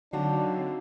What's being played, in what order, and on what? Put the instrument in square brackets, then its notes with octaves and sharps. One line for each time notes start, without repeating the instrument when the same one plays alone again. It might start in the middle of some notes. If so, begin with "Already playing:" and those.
[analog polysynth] D3 [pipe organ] F#3 C4 F5 [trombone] D4 [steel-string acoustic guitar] D#4 F#4